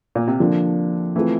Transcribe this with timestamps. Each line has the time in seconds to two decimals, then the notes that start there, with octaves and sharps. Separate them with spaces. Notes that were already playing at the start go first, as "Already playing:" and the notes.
0.15 A#2
0.27 C3
0.40 D3 F3 A#3 D4
1.16 E3 A3 C4 F4 A4